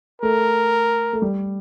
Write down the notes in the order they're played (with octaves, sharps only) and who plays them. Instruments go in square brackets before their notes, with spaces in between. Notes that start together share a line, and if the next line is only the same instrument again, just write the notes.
[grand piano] A3 [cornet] A#4
[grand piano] A3
G3